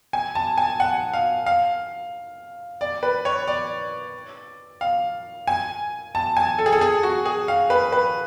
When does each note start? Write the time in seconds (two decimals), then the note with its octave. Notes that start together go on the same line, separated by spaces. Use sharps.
0.13 G#5
0.35 A5
0.58 G#5
0.80 F#5
1.13 F5
1.46 F5
2.81 D5
3.03 B4
3.25 C#5
3.48 D5
4.81 F5
5.47 G#5
6.15 A5
6.37 G#5
6.58 A4
6.66 G#4
6.72 A4
6.81 G#4
7.03 F#4
7.26 G#4
7.48 F5
7.70 B4
7.92 B4